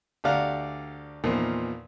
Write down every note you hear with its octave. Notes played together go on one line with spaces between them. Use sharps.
D2 G4 D5 F5 F#5 A#5
E2 A#2 D#3 F3